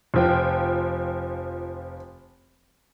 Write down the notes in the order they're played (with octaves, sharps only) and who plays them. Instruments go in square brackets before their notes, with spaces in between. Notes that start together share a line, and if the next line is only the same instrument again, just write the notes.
[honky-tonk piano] F1 F3 G5